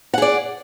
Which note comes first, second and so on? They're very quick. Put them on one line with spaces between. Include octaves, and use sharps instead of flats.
F#5 G#4 D5